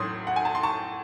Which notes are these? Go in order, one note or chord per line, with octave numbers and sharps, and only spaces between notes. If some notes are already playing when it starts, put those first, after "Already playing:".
Already playing: A1 A2 F#3 C#4 C6 D#6
F#5
G#5
A5
C6
A5 C#6